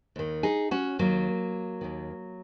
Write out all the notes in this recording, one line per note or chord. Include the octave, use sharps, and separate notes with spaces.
D#2 D#3
D#4 G#4
C#4 F#4
D#2 D#3 F#3 A#3
D#2 D#3